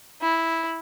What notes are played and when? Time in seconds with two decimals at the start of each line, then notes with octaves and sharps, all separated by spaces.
0.22 E4